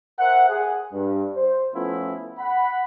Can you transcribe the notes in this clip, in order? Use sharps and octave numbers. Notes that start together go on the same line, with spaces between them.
A#4 C5 E5 F#5
G#4
G2
C5
F3 A3 B3 C#4 E4 F4
F#5 B5